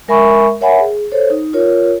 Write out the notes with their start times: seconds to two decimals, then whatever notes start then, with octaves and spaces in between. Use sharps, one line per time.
0.08 G#3 A#4 E5 G#5 B5 C#6
0.61 A#4 C#5 E5 F#5 G#5 B5
0.80 G#4
1.12 A4 C5 C#5
1.30 D#4
1.53 F4 A#4 C#5